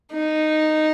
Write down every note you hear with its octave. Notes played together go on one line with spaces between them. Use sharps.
D#4